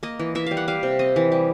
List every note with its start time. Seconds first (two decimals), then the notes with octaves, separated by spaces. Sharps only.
0.03 A#3 D#5
0.20 E3
0.35 E3 E5
0.46 G3 F5
0.57 F#5
0.68 G3 F5
0.83 C3
0.99 C4 D#5
1.16 E3
1.32 G3